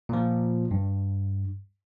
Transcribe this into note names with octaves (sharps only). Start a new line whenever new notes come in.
A#2 F3
G2